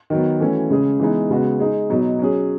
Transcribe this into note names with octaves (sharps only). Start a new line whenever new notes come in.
D#3 F#3 B3
E3 A3 C#4 F#4
C#3 G#3 C#4 G#4
E3 G#3 B3 D#4
C#3 G#3 B3 F#4
G#3 D#4 G#4
B2 F#3 B3 D#4
F#3 C#4 G#4